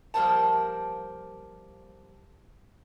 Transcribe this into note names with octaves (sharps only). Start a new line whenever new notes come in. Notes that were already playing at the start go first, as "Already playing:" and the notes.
F3 G3 A#3 A#4 C5 A5